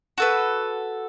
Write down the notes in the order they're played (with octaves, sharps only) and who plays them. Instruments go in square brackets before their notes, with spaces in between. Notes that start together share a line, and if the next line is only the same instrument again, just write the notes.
[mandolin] F#4 A4 B4